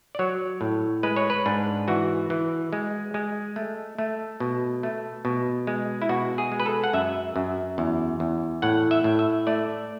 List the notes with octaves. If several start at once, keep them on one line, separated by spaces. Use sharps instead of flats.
D5
F#3 C#5
A2
G#3 B4
C#5
B4
G#2 D4
E3 F#4
E3
G#3
G#3
A3
A3
B2
A3
B2
G#3
E4
B2 F#4
G#4
G#3
B4
A4
F#5
F#2 E5
F#2
E2
E2
A2 F#5
E5
A2
E5
A3 D5